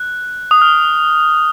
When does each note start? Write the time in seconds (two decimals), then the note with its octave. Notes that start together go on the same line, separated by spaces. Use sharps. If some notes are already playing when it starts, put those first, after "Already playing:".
Already playing: F#6
0.51 D#6
0.62 F6